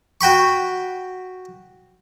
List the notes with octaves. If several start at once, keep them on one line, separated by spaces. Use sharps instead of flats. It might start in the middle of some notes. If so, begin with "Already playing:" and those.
F#4 G5 B5 C#6